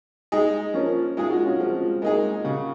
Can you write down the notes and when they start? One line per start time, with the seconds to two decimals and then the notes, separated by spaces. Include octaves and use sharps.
0.32 G#3 D#4 G#4
0.74 F3 A#3 C#4
1.17 G#3 D#4 F4 G#4
1.30 F#4
1.44 C#4 F4
1.59 F3 G#3 C4
2.02 G#3 A#3 D#4 G#4
2.45 C#3